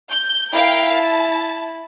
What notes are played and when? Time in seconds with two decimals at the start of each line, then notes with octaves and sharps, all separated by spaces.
0.11 G6
0.53 E4 A#4 F5 G5
0.91 A5